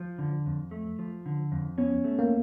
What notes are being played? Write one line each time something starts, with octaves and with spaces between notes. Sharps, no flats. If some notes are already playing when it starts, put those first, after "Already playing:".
Already playing: F3
D3
F2
A3
F3
D3
F2
B3 C#4
A3
A#3